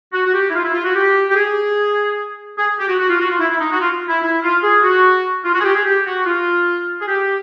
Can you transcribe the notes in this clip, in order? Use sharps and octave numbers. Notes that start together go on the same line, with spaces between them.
F#4
F#4
G4
E4
F4
E4
F4
F#4
G4
G4
G#4
G#4
G4
F#4
F#4
F4
F#4
F4
E4
E4
D#4
F#4
F4
E4
E4
F4
G#4
F#4
F4
F#4
G#4
G4
G#4
G4
F#4
F4
G#4
G4